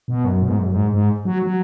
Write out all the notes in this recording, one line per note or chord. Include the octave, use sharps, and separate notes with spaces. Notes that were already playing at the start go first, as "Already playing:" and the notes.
B2
F#2
B2
G#2
F#2
F#2
G#2
G#2
F#3
F#3